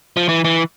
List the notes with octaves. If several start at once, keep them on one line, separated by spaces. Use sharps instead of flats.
F3
E3
E3